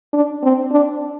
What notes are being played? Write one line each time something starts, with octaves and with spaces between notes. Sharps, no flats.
D4
C4
D4